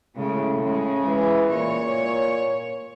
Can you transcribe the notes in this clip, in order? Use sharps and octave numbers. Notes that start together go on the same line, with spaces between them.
A2 C#3 G#3
C#3 G#3
E3
A#2 C#5